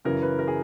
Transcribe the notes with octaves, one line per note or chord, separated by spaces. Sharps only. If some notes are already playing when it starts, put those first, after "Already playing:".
F#2 C#3 E3 A#4
B4
A#4
G#4